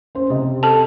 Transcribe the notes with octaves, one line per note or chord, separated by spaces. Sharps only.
C#4 C5
C3 D#5
A4 A5